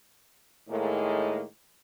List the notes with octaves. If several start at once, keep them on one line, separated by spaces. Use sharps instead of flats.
A2 D#3 G#3 A#3